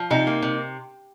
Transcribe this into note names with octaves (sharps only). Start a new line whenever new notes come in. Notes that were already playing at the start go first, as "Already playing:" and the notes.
Already playing: F3
C3 D#4
A#3
C3